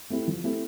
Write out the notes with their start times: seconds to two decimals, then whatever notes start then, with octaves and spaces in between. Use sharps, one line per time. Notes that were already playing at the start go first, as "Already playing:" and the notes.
0.10 A3 C4 E4 G4
0.28 F3
0.44 A3 C4 E4 G4